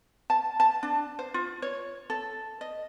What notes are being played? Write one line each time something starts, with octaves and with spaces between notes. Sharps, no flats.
A5
A5
D4
C5
F4
C#5
A4
D#5